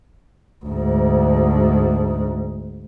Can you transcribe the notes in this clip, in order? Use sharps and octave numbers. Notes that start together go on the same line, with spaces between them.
D2 G#2